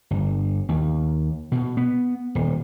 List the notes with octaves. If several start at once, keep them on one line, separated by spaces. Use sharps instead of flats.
G1
D#2
B2
B3
D#1